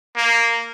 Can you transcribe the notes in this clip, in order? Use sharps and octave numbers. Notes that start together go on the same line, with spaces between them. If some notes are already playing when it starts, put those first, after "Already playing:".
A#3